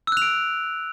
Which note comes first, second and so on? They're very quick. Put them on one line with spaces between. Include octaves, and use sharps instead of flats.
E6 F#6 F7 D7